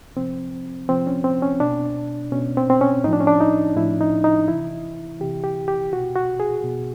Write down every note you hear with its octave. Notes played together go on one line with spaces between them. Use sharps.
C3 F3 C4
C3 F3 C4
C#4
C4
C#4
B2 D4
B2 C#4
C4
C4
C#4
A2 F3 D#4
D4
C#4
D4
D#4
A2 F3 E4
D#4
D#4
C3 E3 E4
C3 E3 G4
G4
G4
B2 F#4
F#4
G#4
B2